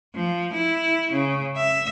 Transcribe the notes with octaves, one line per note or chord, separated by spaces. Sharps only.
F3
E4
C#3
E5